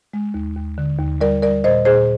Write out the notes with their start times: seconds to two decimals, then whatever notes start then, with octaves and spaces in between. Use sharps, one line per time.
0.13 G#3
0.34 D#2
0.56 D#2
0.78 D3
0.99 D#2
1.21 G3 A#4 D5
1.42 G3 A#4 D5
1.64 A#2 C5 D#5
1.85 A#2 G#4 C5